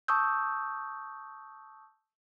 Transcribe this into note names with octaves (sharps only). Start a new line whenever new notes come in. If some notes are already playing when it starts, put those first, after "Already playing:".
A5 C#6 D#6 E6 G6